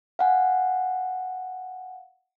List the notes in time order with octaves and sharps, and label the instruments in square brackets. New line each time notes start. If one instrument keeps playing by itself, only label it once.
[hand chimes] F5 F#5 G#5